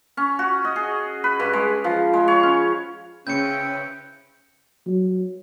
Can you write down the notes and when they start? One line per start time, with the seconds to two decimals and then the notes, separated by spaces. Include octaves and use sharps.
0.17 C#4
0.39 F#4
0.64 D#5
0.76 G#4
1.24 B4
1.39 G2
1.53 G#3
1.84 F3
2.13 G#3
2.28 C#5
2.43 C#4
3.27 C#3 C4 C#4 E4 B4 G6 C#7
4.86 F#3